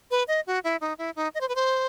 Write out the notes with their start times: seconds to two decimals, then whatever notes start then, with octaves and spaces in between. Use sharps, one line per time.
0.11 B4
0.28 D#5
0.47 F#4
0.64 E4
0.81 D#4
0.98 E4
1.16 D#4
1.35 D#5
1.41 C5
1.49 B4
1.55 C5